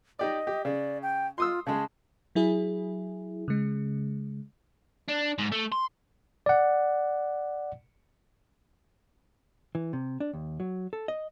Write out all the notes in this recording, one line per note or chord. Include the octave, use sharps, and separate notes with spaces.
D#4 G4 D5 D#5
G4
C#3 D5
G5
F4 C6 D#6 E6
C#3 G#3 A5
F#3 E4 G#4
C#3 G#3
D4
G#2
A3
C6
D5 F#5
E3
C3
D4
D#2
F#3
A4
D#5